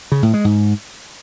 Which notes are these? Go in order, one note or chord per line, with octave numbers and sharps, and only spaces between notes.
C#3
A2
G#3
G#2